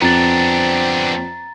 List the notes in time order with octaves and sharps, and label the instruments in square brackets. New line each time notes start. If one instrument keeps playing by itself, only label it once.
[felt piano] F2 [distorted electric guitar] B3 D4 [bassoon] C4 [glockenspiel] A#5 A6